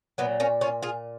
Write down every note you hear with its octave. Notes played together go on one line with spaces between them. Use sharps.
A#2 F#3 B3
A#3 C#4
C#4 F4
F4 G#4